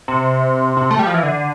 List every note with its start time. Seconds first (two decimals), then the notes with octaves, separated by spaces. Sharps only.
0.08 C3
0.77 C3
0.91 A3
0.99 G3
1.06 F3
1.14 E3
1.23 D3